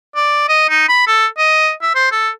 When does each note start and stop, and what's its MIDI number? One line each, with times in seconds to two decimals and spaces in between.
0.16 0.48 74
0.49 0.65 75
0.70 0.87 63
0.89 1.04 83
1.07 1.27 69
1.38 1.71 75
1.82 1.92 76
1.95 2.09 72
2.12 2.29 69